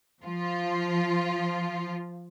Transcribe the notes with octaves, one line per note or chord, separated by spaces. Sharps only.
F3 F4